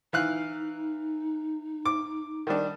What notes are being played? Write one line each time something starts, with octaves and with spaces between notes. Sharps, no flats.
E3 D#4 F5 F#6
D6
D#3 G3 D4